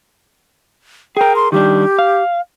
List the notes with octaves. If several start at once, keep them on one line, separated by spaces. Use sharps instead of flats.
G#4 A#4 G5
C6
D#3 G3 D4 G4
F5